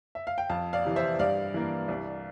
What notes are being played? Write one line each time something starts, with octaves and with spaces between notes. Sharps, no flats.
E5
F5
G5
F2 F5 A5
D5 F5
C3 E3
C5 E5
G2 D5 F5
E3 A#3 D4
C2